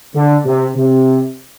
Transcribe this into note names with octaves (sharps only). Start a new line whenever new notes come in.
D3
C3
C3